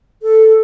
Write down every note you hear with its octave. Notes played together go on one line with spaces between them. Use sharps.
A4